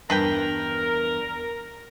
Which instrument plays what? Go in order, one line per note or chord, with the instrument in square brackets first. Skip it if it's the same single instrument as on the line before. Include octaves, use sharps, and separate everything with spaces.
[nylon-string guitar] E2 G2 [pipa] D4 B4 G5 [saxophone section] A#4